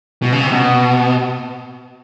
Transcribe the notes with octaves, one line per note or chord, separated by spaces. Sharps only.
B2
C#3
C3
B2